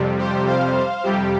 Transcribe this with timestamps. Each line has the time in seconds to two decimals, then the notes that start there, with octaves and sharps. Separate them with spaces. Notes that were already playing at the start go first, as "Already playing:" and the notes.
Already playing: F2 C3 G3
0.18 G4 C5
0.47 C5 F5
1.03 F2 C3 G3 G4